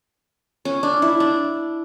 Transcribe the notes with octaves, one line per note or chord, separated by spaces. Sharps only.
C#4
D4
E4
D4